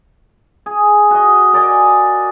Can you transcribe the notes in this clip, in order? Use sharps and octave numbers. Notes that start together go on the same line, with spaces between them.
G#4
F#4 D#5
A#4 D5 D#5 G#5